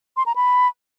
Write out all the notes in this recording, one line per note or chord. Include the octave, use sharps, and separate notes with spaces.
C6
A#5
B5